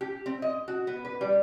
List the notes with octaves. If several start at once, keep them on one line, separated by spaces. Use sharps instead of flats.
G4
C4
D#5
F#4
B3
B4
G3